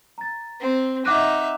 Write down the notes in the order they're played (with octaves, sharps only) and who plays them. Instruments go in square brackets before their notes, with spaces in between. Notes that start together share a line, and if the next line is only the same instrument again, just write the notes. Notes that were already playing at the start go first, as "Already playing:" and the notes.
[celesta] A#5 A6
[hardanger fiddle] C4
[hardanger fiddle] D#4 E5 [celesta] F#5 D6 F#6